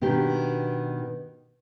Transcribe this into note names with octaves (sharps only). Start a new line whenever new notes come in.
B2 D#3 D4 G4